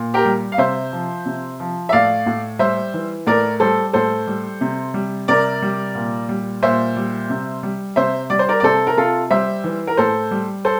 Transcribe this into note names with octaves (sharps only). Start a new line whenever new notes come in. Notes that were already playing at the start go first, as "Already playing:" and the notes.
Already playing: A#2
G4 A#4
G3
F5
C3 C5 E5
F3
C3
F3
E5
A2 D5 F5
A2
G3 C5 E5
E3
A2 A#4 D5
G3 A4 C5
A2 A4 C5
G3
C3
G3
C3 A#4 D5
G3
A#2
G3
A#2 C5 E5
G3
C3
G3
C3 C5 E5
G3 D5
C5
A#4 D5
D5
C3 A4 C5
A#4
C3 F4 A4
G3 C5 E5
E3
A#4
A2 A4 C5
G3
A4 C5